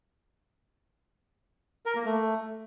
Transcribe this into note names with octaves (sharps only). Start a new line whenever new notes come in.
A#4
A#3
A3